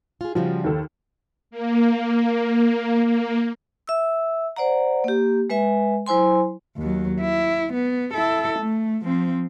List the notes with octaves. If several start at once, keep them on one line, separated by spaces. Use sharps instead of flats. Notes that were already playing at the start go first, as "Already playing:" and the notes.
F4 G#4
C#3 F3 G3 F#4
D#2 A4
A#3
A#3
E5 E6
C5 D5 F#5 A#5
A#3 G4
G#3 B4 E5 G#5
F#3 E4 C5 G#5 C6
D#2 F#3
E4
B3
E4 A4
A3
F3 C4